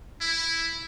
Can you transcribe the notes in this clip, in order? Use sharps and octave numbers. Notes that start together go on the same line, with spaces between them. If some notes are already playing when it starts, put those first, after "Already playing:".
E4